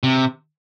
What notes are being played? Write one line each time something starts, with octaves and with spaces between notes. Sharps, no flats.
C3